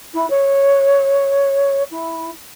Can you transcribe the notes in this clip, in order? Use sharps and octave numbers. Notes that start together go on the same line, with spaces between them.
E4
C#5
E4